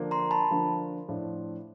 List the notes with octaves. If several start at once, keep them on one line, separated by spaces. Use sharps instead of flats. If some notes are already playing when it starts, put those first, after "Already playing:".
Already playing: D3 F3 A#3 D4
A#5 C6
A5 B5
D3 F3 A#3 D4
A2 F3 A3 D4 F4